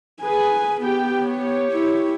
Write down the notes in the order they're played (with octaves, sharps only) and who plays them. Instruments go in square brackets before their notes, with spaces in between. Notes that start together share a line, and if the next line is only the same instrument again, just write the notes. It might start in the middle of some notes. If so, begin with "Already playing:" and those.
[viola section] G#4 B4 [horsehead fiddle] G#5
[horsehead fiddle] B3 [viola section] G4 G5
[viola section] G4 C#5
[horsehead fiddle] E4